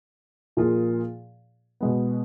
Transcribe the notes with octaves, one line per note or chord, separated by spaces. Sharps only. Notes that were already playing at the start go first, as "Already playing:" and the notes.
A#2 F3 A#3 F4 G#4
B2 G#3 B3